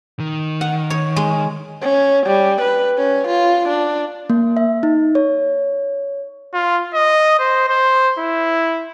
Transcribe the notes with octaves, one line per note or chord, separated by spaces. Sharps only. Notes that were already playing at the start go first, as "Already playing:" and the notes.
D#3
F#5
C#5
G#3
C#4
G3
B4
C#4
F4
D4
A#3
E5
D#4
C#5
F4
D#5
C5
C5
E4